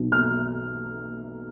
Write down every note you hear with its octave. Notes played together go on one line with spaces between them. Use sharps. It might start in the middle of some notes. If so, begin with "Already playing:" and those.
Already playing: B1 B2
F6